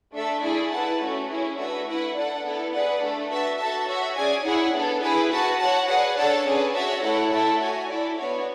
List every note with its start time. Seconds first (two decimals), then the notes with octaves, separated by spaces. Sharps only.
0.14 A3 D4 A4 E5
0.43 A3 E4 G#4 D5
0.72 E4 B4 F#5 A5
1.01 A3 C#4 F#4
1.29 C#4 E4 G#4
1.58 A3 D4 F#4 B4 E5
1.87 E4 B4 F#5
2.15 D4 A4 D5 F#5
2.44 B3 E4 A4
2.72 G#4 B4 D5 F#5
3.01 A3 D4 A4
3.30 F#4 B4 E5 A5
3.59 F#4 A4 E5 A5
3.87 F#4 C#5 E5
4.16 C#4 G#4 D5 G#5
4.45 E4 G#4 C#5 F#5
4.73 B3 D4 A4
5.02 E4 G#4 B4
5.31 F#4 B4 F#5 A5
5.59 F#4 C#5 F#5 A5
5.88 G#4 B4 D5 F#5
6.17 D4 A4 C#5 F#5 A5
6.46 C#4 G#4 B4 D5
6.74 F#4 C#5 E5 A5
7.03 A3 E4 A4 C#5 F#5
7.31 A3 E4 A4 E5 A5
7.60 F#4 C#5 G#5
7.88 E4 A4 D5
8.18 B3 D4 F#4 C#5